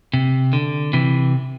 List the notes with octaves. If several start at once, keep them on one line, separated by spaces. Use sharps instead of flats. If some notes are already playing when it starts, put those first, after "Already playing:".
C3
D3
C3 E3